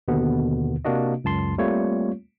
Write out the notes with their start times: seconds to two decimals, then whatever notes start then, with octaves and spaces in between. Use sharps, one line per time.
0.08 D#2 B2 D3 B3
0.85 C3 A#3 D4 F#4 D#5
1.24 C#2 F#2 A5 C6
1.58 G3 A3 A#3 C4 F4 C#5